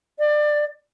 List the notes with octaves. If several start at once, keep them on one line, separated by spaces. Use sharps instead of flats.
D5